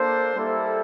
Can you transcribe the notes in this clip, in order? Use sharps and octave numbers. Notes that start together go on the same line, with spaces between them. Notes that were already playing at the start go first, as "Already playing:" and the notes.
Already playing: A#3 D4 A4 C5
G3 A#3 E4 A4 C5